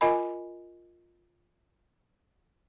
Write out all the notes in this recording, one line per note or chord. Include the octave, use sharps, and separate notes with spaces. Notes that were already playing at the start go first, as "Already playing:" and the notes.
F4 A#4 D#5 G#5 B5